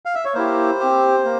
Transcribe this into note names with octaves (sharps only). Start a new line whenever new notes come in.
F5
E5
C#5
A#3 E4 G4 C5
C4 G4
A#3